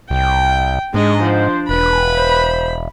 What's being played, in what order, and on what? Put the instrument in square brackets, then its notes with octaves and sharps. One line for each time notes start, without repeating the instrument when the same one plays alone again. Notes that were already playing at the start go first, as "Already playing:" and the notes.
[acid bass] C2 [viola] G5
[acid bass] G#2 [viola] G#3 D#5 [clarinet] D4
[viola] F3 [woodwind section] C5
[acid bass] E1 [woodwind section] B4 [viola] B5
[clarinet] C5